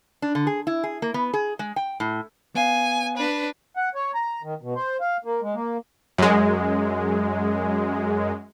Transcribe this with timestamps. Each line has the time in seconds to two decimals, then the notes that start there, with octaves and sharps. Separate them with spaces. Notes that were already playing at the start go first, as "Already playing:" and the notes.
0.22 D4
0.35 D3
0.47 G#4
0.67 E4
0.84 G#4
1.02 A#3
1.14 B3
1.34 G#4
1.59 G#3
1.76 G5
2.00 A2
2.55 B3 F5 G#5
3.17 D4 B4
3.77 F#5
3.95 C#5
4.15 A#5
4.43 D#3
4.61 B2
4.76 C5
5.01 F5
5.24 A#3
5.42 G#3
5.54 A#3
6.18 F#2 G#3